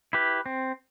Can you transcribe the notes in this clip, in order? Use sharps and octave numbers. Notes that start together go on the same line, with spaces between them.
E4 G4 B4
C4